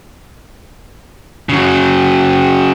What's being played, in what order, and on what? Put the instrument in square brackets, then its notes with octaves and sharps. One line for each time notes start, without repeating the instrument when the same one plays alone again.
[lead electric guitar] C#3 F#3